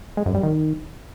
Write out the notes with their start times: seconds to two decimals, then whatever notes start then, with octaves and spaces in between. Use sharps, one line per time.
0.17 G#3
0.26 F#2
0.35 G3
0.43 D#3